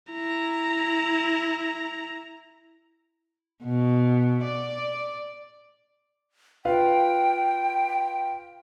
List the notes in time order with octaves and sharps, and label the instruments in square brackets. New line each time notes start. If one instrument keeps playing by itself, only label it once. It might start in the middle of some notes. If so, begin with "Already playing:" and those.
[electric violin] E4 A#5
[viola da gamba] B2
D5
[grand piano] F4 B4 F5 [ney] G5